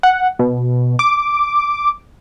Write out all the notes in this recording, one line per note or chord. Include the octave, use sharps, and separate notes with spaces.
F#5
B2
D6